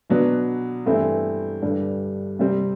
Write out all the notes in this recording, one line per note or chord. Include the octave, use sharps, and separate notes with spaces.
B2 F#3 B3 D4
G2 E3 A3 C4 E4
G2 D3 G3 D4 A4
C3 G3 C4